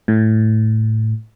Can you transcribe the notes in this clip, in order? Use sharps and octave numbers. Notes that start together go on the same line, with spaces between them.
A2